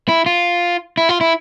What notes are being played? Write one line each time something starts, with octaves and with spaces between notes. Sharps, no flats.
E4
F4
E4
F4
E4